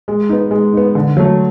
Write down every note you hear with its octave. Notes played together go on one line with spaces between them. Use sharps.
G#3
B3 D#4
G#3
B3 D#4
D3
F#3 A3